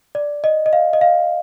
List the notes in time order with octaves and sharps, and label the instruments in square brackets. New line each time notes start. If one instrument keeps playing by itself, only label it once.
[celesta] D5
D#5
D#5
F5
D#5
F5